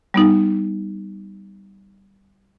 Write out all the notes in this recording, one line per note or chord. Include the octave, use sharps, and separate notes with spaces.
G3 B3 D#4